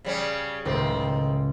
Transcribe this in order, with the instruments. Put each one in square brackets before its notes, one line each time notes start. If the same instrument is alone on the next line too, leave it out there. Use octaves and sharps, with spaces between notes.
[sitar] C#3 G3 C#4
[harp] C#2 A2 [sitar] D#3 C4